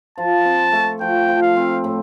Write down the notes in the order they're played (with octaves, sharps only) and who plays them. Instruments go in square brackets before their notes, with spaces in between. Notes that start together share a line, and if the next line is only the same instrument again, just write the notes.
[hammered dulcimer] F3 [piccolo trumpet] A5
[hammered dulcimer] C4
A3
[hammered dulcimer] F3 [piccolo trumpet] G5
[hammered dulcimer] F3
[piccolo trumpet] F5
[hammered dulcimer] C4
A2